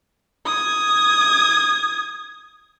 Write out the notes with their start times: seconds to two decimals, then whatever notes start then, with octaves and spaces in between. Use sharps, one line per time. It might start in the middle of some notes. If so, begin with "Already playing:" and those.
0.46 D#6 G#6